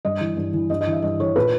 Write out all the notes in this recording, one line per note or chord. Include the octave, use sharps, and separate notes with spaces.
G2 D#5
E3
G2
E3
G2 D#5
D#5
E3
E5
G2 D#5
E3 C#5
A#2 B4